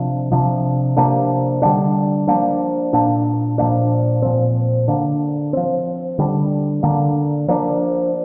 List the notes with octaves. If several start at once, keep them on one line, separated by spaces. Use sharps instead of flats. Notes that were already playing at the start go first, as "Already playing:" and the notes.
Already playing: C3 F3 D4
C3 F3 D4
C3 F3 A#3 D4
D3 G3 A#3 D4
F3 A#3 D4
A#2 A#3 D4
A#2 F3 A#3 D4
A#2 F3 C4
D3 A#3 D4
F3 C4
D3 G3 D4
D3 A#3 D4
F3 A#3 D4